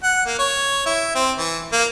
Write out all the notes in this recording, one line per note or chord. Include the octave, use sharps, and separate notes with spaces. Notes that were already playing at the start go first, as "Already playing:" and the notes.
F#5
A#3
C#5
E4
C4
E3
A#3